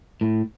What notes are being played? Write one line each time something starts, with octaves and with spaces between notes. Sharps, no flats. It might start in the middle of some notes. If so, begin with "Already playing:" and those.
A2